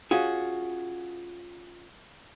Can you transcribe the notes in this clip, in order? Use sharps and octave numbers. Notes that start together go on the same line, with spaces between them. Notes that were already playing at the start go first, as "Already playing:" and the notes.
C#4 F4 F#4 G#4